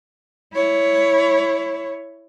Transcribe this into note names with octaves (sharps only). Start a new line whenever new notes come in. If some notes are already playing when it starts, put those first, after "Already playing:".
E4 C#5